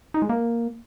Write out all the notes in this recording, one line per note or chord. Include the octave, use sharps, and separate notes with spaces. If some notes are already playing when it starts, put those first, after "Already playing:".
D#4
G#3
A#3